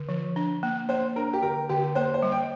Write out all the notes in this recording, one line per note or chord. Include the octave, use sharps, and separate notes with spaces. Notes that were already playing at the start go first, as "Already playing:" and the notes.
Already playing: D3
F3
D4
A#3
A#3 C5
D4 A#4
G4
D3 A#4
D3 G4
A#3 C5
C5
G3
G5